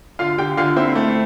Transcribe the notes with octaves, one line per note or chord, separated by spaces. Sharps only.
D3 F4 F5
D3 G4 G5
D3 F4 F5
C4 E4 E5
A3